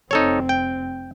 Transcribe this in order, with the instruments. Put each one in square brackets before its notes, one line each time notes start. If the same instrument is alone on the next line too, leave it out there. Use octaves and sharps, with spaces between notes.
[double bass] F1 C4 [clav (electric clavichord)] D#4 A4 C#5
[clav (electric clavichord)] G5